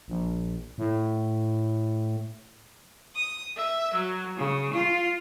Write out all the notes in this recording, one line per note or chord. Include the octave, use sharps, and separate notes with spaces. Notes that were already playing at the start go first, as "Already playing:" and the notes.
A#1
A2
D#6
E5
F#3
C#3
F4